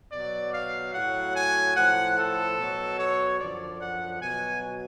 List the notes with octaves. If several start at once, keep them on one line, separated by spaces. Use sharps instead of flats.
B2 F#3 D5
F5
A2 F#3 F#5
G#5
A2 F3 F#5
A4
B2 F#3
C#5
F#2 D3 F3 D5
F#5
B2 F#3 G#5